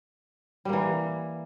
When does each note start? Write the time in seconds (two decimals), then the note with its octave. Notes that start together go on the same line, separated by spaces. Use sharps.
0.65 G3
0.69 A#3
0.73 E3